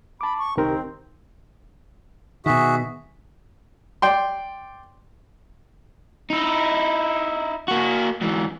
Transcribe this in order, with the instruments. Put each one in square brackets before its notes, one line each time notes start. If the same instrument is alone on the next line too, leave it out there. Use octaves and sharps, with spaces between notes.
[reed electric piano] A5 D6 [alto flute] B5
[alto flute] C#6
[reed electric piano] C2 G4 A#4 [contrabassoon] D#3 [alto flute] C4
[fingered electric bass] B2 D#3 [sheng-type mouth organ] F#4 G#4 E5
[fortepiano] D5 G5 C6
[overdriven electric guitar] D#4 E4
A#3 F#4
G#2 E3